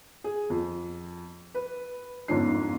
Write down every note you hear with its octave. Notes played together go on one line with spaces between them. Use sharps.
G#4
F2
B4
G1 F2 G#2 C#4 D4 C7